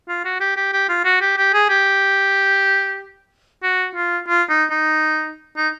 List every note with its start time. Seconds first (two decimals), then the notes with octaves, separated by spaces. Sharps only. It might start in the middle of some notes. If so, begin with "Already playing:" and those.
0.08 F4
0.25 F#4
0.40 G4
0.56 G4
0.73 G4
0.89 F4
1.05 F#4
1.21 G4
1.37 G4
1.53 G#4
1.69 G4
3.63 F#4
3.95 F4
4.28 F4
4.49 D#4
4.71 D#4
5.57 D#4